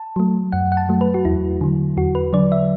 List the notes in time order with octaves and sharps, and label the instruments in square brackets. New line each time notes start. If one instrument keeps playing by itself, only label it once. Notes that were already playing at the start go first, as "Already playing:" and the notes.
Already playing: [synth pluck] A5
F#3 A3
F#2 F#5
F#5
A5
F#3 A3
B4
F#4
E2 E4
D3 F#3
E2 F#4
B4
D3 F#3 D5
E5